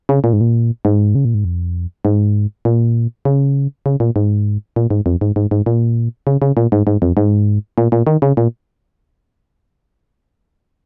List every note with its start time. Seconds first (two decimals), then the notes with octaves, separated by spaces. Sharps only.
0.09 C#3
0.24 A#2
0.33 G#2
0.41 A#2
0.85 G#2
1.15 C#3
1.25 A#2
1.34 G#2
1.45 F2
2.05 G#2
2.65 A#2
3.25 C#3
3.86 C#3
4.00 A#2
4.16 G#2
4.76 A#2
4.90 G#2
5.06 F2
5.21 G#2
5.36 G#2
5.51 G#2
5.66 A#2
6.27 C#3
6.42 C#3
6.57 A#2
6.72 G#2
6.87 G#2
7.02 F2
7.17 G#2
7.78 A#2
7.92 A#2
8.07 D#3
8.22 C#3
8.37 A#2